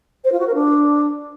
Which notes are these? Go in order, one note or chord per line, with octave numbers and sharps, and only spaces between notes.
C5
F4
F#4
A#4
D4